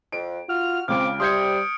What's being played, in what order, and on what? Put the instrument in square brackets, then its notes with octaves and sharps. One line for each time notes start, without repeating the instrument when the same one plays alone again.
[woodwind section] F2 [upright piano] D7
[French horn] F4 [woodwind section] F#4 F6
[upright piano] C#2 C#3 [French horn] C4 [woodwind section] D6 [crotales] F6 D7
[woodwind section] C3 [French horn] G3 [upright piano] C6 G6 G#6 [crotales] D#6 C#7